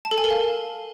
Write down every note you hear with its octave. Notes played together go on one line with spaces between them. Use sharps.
A5
A4
G#5
A#4
F5